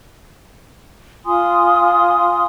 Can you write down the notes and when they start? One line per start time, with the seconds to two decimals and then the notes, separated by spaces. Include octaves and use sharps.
1.26 F4 G#5 C6 D#6